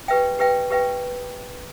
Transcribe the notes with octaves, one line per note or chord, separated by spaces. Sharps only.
G4 B4 E5 G5
G4 B4 E5 G5
G4 B4 E5 G5